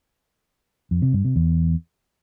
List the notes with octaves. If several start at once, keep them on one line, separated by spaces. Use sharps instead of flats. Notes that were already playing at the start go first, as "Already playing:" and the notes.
F2
C3
G2
C3
E2